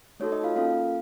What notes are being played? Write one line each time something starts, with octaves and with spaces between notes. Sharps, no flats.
A3 D#4 F#4 A4 C#5
D#4 D#5
F4 F5
A#3 C#4 F4 A4 F5